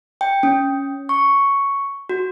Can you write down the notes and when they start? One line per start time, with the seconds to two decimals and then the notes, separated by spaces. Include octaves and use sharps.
0.21 G5
0.43 C#4
1.09 C#6
2.09 F#4